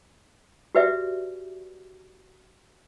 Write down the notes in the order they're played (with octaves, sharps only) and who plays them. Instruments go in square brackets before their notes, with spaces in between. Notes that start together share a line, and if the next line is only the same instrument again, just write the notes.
[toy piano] F#4 G4 B4 D5 E5